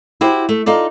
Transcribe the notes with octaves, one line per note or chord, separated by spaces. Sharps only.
E4 F#4 G4 C5
A3
D#4 F4 A4 D5